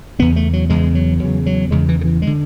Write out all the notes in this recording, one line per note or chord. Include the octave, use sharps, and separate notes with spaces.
E2 C#3 B3
A3
F#3
E2 C#3 G#3
F#3
E2 C#3 F#3
F#3
E2 C#3 G#3
E3
D3
E3
G#3
D3